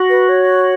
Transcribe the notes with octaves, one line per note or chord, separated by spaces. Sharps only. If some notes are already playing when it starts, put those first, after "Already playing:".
Already playing: F#4
B4
C#5